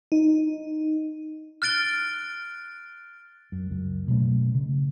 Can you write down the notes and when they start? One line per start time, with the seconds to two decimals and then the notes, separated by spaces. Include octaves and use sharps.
0.12 D#4
1.62 F6 F#6 A6 D7 G7
3.52 F#2
3.69 C#2 F#2
4.08 B2 F#3 A3 C#4
4.55 C#3